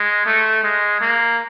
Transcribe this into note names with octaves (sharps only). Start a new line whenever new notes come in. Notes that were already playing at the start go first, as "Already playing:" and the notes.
Already playing: G#3
A3
G#3
A#3